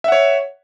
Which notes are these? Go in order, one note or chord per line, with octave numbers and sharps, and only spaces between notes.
C#5 E5 F#5